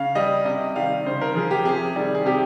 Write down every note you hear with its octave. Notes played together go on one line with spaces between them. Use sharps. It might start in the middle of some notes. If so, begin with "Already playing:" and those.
Already playing: C#3 F5
G3 D#5
C3 D#5
D#3 G3 F5
C#3 C5
A#4
F3 G#4
G4
C3 G#4
D#3 G3
G#4
C3 G4